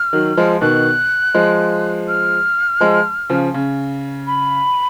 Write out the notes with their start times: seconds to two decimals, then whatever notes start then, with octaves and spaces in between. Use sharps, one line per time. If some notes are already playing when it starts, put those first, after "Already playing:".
Already playing: F6
0.13 D#3 F#3
0.37 F3 G#3
0.61 B2 D#3 F#6
1.34 F3 G#3
2.08 F6
2.81 F3 G#3
3.30 C#3 F3
3.54 C#3
4.27 B5